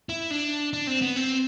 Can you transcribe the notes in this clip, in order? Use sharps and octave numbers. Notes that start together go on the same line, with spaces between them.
E4
D4
D4
C4
B3
C4